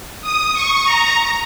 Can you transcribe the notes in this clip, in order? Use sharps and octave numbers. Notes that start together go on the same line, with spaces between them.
D#6
C#6
A#5